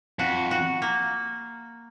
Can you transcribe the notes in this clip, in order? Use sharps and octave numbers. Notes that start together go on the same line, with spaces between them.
F2 F#4
F#4
A#3